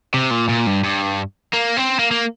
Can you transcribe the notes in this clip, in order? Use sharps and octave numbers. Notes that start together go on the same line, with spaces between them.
C3
A#2
A#2
G2
G2
A#3
C4
A#3
A#3